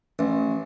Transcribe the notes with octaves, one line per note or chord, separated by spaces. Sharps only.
A1